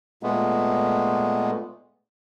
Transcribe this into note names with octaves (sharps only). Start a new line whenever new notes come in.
A#2 G#3 A3 B3